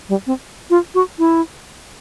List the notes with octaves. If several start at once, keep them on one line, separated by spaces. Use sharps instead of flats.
G3
C4
F4
F#4
E4